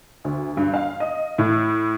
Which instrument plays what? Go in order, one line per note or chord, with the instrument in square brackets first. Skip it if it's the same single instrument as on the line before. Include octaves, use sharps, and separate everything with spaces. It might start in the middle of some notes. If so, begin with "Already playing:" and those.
[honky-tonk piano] D2
G2
F5
D#5
A2